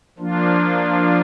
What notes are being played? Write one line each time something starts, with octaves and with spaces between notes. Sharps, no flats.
F3 A#3 D4 F4